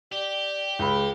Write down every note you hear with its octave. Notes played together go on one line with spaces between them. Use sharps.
G4 D5
C#2 G#4 B5